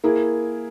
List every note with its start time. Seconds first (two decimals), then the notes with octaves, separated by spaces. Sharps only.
0.04 A#3 E4 G#4